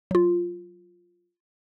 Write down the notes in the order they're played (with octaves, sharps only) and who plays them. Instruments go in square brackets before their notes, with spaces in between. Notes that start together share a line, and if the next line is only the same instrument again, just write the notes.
[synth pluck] F#3 F4